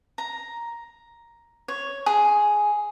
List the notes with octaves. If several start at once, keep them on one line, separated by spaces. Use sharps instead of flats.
A#5
C#5
G#4